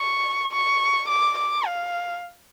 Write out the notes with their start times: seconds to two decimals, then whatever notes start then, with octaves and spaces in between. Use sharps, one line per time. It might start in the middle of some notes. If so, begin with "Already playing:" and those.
Already playing: C#6
0.52 C#6
1.08 D6
1.38 D6
1.66 F5